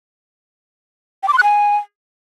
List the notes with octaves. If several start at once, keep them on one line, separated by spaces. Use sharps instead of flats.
G5
D6
C6
F#6
G#5